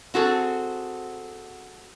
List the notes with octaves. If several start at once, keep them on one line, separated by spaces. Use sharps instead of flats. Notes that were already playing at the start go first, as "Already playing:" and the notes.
C4 F#4 G#4 A4